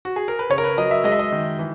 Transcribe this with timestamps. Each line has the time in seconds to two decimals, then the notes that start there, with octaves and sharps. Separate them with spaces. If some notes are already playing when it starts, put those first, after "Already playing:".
0.05 F#4
0.16 G#4
0.28 A#4
0.39 B4
0.50 C#3 C#5
0.58 A#4
0.64 B4
0.77 F#3 D#5
0.91 E5
1.04 G#3 D#5
1.12 E5
1.19 D#5
1.32 D#3
1.59 E3